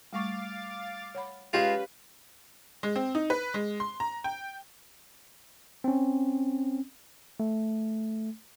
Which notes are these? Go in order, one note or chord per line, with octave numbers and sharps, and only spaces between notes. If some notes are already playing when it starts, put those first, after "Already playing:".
G3 A3 F5 C#6 D6 A6
C#5 F#5 B5
G#3 C#4 F4 G4 B4 F5
G#3
C4
D#4
B4
G#3
C6
A#5
G5
C4 C#4
A3